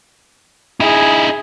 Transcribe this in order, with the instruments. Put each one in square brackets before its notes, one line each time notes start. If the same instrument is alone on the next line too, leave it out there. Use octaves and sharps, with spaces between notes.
[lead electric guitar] D#4 E4 [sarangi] G#4